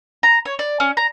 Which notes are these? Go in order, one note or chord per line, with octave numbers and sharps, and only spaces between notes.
A#5
C#5
D5
C#4
A#5